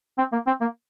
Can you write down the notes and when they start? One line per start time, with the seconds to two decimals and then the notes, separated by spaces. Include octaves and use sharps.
0.18 C4
0.32 A#3
0.47 C4
0.61 A#3